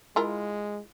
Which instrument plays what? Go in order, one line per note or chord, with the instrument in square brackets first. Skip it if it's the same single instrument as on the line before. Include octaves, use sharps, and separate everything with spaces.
[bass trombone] G#3 [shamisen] E4 F4 A#4